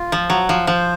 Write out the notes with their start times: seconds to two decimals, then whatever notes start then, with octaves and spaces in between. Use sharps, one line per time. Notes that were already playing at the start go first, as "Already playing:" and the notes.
Already playing: F4
0.12 F3
0.30 F#3 F#5
0.49 F3
0.67 F3 C5